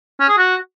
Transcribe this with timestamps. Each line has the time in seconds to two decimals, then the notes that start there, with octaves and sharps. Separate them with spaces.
0.20 C#4
0.29 G#4
0.37 F#4